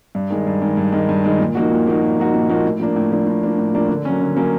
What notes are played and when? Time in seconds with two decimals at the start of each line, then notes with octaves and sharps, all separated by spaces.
0.15 G2
0.30 D#3 G#3
0.47 G2
0.62 D#3 G#3
0.77 G2
0.93 D#3 G#3
1.09 G2
1.24 D#3 G#3
1.39 A#2
1.55 F3 A#3 D#4 F#4
1.71 A#2
1.87 F3 A#3 D#4 F#4
2.02 A#2
2.18 F3 A#3 D#4 F#4
2.34 A#2
2.49 F3 A#3 D#4 F#4
2.65 A2
2.80 F3 A#3 D4
2.96 A2
3.12 F3 A#3 D4
3.27 A2
3.43 F3 A#3 D4
3.58 A2
3.74 F3 A#3 D4
3.90 D3
4.05 F#3 A#3 C#4
4.21 D3
4.37 F#3 A#3 C#4